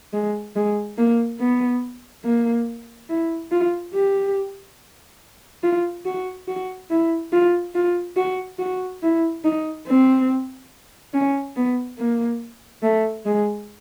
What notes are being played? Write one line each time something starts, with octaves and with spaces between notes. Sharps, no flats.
G#3
G#3
A#3
B3
A#3
E4
F4
G4
F4
F#4
F#4
E4
F4
F4
F#4
F#4
E4
D#4
C4
C#4
B3
A#3
A3
G#3